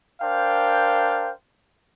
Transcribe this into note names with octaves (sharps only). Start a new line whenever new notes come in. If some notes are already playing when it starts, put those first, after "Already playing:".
D4 A#4 C5 F5 G5